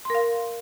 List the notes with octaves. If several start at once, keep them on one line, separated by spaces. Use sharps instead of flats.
A#4 F5 C6